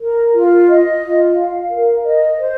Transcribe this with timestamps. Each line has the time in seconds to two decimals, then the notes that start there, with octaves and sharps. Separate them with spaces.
0.01 A#4
0.35 F4
0.69 D#5
1.01 F4
1.35 F5
1.69 A#4
2.05 D#5
2.39 C5